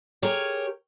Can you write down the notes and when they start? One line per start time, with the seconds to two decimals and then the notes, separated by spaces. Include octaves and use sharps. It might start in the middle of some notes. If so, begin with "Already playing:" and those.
0.22 G4 G#4 A#4 C#5